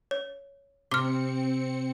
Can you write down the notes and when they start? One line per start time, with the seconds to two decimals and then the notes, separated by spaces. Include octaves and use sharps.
0.11 C#5
0.91 C3 C4 D6 F6 C#7